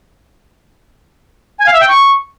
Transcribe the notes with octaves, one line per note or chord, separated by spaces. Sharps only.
G#5
F5
E5
G5
C#6